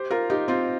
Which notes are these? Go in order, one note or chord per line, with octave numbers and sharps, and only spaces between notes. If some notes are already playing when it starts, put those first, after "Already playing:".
Already playing: G4 C5
F4 A#4
D#4 G4
C4 F4